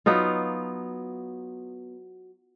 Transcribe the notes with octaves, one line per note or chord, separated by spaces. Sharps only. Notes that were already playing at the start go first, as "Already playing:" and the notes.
F#3 B3 D#4 F4